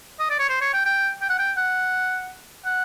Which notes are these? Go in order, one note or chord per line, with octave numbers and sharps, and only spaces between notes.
D#5
D5
C#5
C5
C#5
G5
G5
G5
F#5
G5
F#5
F#5